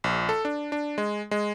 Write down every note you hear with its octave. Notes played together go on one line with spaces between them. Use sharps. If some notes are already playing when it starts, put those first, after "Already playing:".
A#1
A4
D4
D4
G#3
G#3